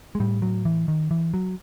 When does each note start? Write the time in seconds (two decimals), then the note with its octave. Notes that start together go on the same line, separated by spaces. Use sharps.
0.15 G#3
0.20 A2 G3
0.42 F#3
0.65 E3
0.88 D#3
1.11 E3
1.34 F#3